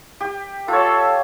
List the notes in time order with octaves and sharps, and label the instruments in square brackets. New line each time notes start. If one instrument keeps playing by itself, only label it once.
[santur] G4
[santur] F4 C#5 [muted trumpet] A4 [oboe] E5